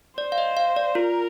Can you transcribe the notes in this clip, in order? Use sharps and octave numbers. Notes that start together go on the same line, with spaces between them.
C5 D5
F5
D#5
F5
D5
F4 A#4